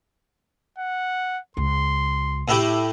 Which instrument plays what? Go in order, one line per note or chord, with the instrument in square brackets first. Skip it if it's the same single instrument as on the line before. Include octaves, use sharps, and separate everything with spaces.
[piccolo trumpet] F#5
[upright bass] C#2 [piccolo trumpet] C6
[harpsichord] A2 E4 G4